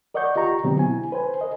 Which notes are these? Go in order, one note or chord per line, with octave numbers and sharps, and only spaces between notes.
A#4 D5 D#5 F#5 C#6 G6
F4 G4 A#5 C#6
B2 D3 F#3 B3 C4 G4
E4 G#5
B4 C5 G#5
A#4 D#5